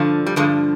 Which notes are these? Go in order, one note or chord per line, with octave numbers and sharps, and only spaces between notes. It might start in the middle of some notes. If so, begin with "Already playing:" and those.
Already playing: G2 D3 F3
G3
G2 D3 F3 G#3